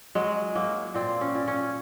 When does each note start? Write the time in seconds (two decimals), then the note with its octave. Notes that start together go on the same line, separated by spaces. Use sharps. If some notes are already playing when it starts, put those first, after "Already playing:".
0.15 F#3 G#3
0.55 F#3 A#3
0.94 A#2 C4
1.21 C#4
1.34 A#2
1.48 C#4